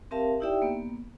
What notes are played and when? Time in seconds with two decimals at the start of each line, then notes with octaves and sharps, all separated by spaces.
0.11 C4 G4 A#4 E5 F5 A5
0.40 D#4 E4 G4 D5 E5 G5
0.62 A#3 B3